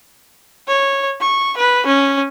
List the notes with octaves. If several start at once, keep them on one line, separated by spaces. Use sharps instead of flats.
C#5
C#6
B4
C#4